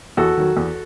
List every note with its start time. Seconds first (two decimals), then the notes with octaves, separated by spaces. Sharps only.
0.17 E2 F#4 A4
0.37 D#3 F#3
0.57 E2